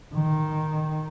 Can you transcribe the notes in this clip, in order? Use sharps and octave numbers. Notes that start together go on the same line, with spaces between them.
D#3